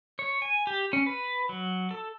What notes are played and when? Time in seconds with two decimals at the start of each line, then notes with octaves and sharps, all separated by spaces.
0.19 C#5
0.42 G#5
0.67 G4
0.93 C#4
1.06 B4
1.49 F#3
1.91 A4